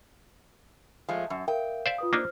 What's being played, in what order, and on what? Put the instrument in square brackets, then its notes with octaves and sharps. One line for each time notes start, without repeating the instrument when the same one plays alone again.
[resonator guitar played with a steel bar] F3 G#3 A3
F#2
[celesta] A#4 E5 F5 [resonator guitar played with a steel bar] G5
[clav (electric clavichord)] C5 D5 E5 [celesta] F5
[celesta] F4 B4 D#6
[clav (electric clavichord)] A#3 D4 D#4 [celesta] C5 F6